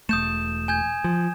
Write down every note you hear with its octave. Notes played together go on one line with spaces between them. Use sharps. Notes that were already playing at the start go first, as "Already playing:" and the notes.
E1 A3 D#6 G6 E7
G#5 G6 G#6
F3